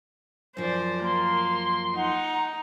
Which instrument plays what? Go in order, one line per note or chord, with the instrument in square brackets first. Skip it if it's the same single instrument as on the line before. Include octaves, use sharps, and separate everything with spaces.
[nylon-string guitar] F#2 F3 [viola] C5 D5
[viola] A#3 [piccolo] C6
[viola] D#4 [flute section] F#5 A#5